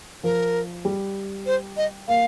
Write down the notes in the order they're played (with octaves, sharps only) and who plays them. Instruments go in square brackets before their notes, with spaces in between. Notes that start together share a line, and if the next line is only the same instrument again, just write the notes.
[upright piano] F3 [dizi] A#4
[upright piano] G3
[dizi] C5
D#5
[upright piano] A#3 [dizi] F5